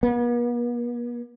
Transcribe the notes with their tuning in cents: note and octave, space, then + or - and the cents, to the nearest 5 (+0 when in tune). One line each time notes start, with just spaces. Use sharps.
B3 -45